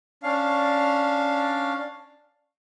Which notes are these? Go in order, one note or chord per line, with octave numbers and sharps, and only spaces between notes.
C#4 D4 F5